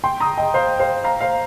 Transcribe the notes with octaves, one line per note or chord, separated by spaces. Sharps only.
G5 C6
A#5 D#6
D#5 G5
C5 F5
C5 F5
F5 A#5
C5 F5